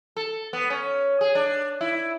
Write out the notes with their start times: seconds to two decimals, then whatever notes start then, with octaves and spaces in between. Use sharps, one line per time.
0.17 A4
0.53 B3
0.70 C#4
1.21 G#4
1.35 D4
1.81 E4